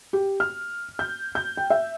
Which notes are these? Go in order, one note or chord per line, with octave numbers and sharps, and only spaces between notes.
G4
F6
G6
G6
G5
E5